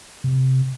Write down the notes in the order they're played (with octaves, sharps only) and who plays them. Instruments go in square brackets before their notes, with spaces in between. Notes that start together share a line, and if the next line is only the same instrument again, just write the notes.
[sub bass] C3